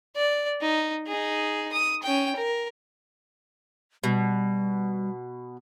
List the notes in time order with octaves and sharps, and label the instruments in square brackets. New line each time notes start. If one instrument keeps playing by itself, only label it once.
[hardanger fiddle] D5
D#4
D#4 G#4
D#6
C#4 G5
A#4
[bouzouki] B2 [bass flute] G3